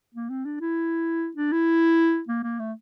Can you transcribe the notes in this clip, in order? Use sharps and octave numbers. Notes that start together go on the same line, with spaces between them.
A#3
C4
D4
E4
D4
E4
A#3
A#3
A3